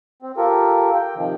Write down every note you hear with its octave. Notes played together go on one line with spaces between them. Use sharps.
C4
F4 G4 A4 A#4
G5
C3 D#3 F3